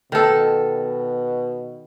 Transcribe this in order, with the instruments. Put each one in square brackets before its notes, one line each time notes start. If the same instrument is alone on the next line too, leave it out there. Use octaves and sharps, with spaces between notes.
[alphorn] B2 [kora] D#3 A4